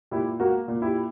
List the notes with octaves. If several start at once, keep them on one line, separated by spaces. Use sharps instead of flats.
A#2 E4 G4
A#3 F#4 A#4
A#2
E4 G4